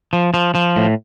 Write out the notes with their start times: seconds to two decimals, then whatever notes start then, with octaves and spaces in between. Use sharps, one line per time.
0.13 F3
0.34 F3
0.55 F3
0.76 A2